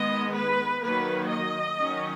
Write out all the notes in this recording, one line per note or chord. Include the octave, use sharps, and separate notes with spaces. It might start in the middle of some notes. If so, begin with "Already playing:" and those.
Already playing: D#3 G#3 B3 D#5
B4
D#3 F#3 A#3 B4
D#5
D#3 F#3 C#4